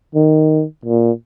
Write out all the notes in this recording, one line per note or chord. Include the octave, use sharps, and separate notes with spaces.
D#3
A#2